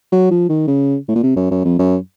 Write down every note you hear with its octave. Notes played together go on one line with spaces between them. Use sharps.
F#3
F3
D#3
C#3
A2
A#2
C3
F#2
F#2
F2
F#2